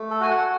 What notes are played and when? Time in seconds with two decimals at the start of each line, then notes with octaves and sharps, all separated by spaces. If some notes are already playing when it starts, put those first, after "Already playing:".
Already playing: A3
0.11 A4
0.20 F#4 G#5
0.30 F#5